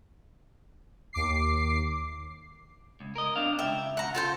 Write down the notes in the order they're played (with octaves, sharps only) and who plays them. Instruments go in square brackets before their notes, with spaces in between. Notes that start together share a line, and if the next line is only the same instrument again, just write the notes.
[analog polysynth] D#2 D6 C7
[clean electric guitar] C#2
A#4 D#5
C4 D4 F5
[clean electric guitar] C#2 G5 [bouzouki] E5
[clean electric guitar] C#3 [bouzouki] F#5 A#5
[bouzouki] F4 A4 C5